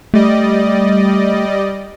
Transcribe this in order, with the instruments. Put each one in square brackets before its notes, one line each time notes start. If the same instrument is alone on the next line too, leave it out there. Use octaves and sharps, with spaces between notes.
[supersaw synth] G3 D5 D#5 [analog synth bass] A3